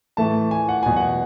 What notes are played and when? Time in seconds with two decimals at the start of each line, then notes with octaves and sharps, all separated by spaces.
0.17 A2 E3 A3 A5
0.51 G#5
0.69 F#5
0.83 E2 B2 F#3 G#5
0.96 F#5